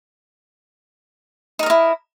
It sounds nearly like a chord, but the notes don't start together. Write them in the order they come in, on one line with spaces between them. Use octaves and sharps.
D#4 A#4 D#5 E4